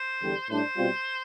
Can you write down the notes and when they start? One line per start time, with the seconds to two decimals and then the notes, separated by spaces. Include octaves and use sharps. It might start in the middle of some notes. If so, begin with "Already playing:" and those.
Already playing: C5
0.21 E2 D3 G3
0.49 A2 G3 D4 C5
0.77 B2 G3 C4 F4